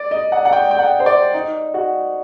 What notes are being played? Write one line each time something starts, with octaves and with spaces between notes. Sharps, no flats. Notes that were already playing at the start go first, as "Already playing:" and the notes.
Already playing: D5
D#5
F#5
F#5
G5
G5
F#5
C5
D5
D#4
F#4